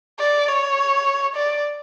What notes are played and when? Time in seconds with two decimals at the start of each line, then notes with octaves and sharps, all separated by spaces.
0.19 D5
0.48 C#5
1.35 D5